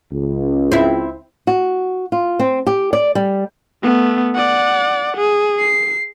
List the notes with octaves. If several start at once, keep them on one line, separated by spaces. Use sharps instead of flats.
C#2
C4 E4
F#4
F4
C4
G4
D5
G3
A3 B3
D5 F#5
G#4
C7